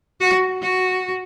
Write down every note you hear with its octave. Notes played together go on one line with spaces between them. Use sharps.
F#4
F#4